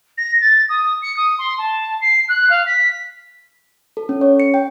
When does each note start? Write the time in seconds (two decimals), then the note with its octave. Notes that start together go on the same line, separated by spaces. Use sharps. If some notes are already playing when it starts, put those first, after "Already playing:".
0.17 A#6
0.40 A6
0.69 D#6
1.02 C#7
1.16 D#6
1.38 C6
1.58 A5
2.01 C7
2.28 F#6
2.49 F5
2.66 B6
3.97 A4
4.09 C#4
4.21 C#5
4.40 C#7
4.54 G5